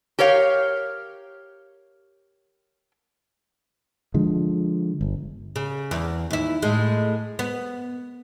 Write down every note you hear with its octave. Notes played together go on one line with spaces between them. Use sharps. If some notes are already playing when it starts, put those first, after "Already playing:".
G4 A#4 C#5 F5
D3 F3 G#3
G1
C#3
E2
D#2 E4
A2 G#3
B3